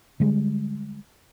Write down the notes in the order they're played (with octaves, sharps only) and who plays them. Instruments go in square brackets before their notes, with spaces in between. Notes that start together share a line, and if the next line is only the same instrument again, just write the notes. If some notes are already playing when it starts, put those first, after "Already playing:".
[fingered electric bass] D3 G3 G#3